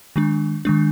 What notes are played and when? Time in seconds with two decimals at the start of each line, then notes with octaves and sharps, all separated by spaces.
0.16 D#3 G#3 D4
0.65 D#3 G#3 D4